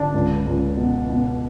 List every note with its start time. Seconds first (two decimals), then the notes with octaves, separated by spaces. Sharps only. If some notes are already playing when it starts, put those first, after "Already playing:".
Already playing: D3 D4
0.14 C#2
0.46 C#2
0.77 B2
1.09 B2